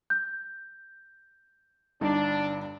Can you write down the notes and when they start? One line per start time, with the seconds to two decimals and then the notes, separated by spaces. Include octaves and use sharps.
0.10 G6
2.01 G1 G2 D4 D#4